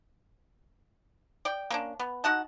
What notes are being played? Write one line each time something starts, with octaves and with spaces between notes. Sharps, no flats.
D5 G5
A#3 C#4 D4
B3
D#4 F#4 F#5 A5